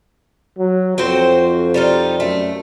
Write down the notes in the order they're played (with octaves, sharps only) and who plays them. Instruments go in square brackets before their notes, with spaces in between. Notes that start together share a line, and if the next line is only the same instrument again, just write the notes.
[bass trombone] F#3
[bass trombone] F2 [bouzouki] C4 F#4 C5
[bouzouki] G3 D#4 F4
[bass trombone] F#2 [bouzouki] A3